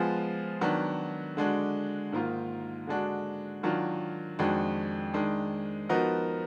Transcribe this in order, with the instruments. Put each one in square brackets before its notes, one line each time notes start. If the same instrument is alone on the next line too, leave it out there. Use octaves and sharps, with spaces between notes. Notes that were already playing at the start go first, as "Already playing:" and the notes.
Already playing: [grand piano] F3 G#3 B3 F4 G#4
D#3 F#3 B3 D4
D3 G#3 D4 F#4
G#2 D#3 A#3 F4
D3 G#3 D4 F#4
D#3 F#3 D4 F4
F2 D#3 G#3 D4 F#4
D#3 G#3 D4
F3 B3 D#4 F#4 A#4